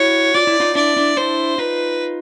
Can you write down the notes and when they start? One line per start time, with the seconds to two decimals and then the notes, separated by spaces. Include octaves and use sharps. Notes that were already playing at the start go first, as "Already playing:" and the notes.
Already playing: E4 F#4 C#5
0.34 F4 D5
0.47 E4
0.60 D#4 F4
0.75 D4 E4 D5
0.97 D4 E4
1.17 D4 E4 C5
1.58 D#4 F4 B4